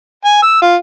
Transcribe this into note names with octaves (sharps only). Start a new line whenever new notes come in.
G#5
E6
F4